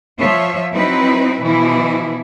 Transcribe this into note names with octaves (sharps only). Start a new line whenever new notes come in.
F3 F4 C#5 E5
F#3 C4 D#4 E4 B4
B2 E3 F3 E4